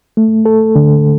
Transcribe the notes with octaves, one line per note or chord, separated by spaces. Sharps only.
A3
A4
D3